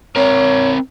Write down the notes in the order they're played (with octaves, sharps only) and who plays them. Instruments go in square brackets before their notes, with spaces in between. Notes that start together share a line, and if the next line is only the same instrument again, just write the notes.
[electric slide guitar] C4 A#4 [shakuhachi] C#5